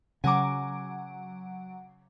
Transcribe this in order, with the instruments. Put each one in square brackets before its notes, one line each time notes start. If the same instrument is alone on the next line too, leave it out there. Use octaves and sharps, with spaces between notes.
[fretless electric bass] C#3 [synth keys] F#3 F#5 D7 [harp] G#5 A#5 D6